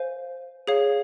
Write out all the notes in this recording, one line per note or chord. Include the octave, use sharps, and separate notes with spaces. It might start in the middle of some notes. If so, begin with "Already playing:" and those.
Already playing: C5 F5 G#5
G#4 C#5 F5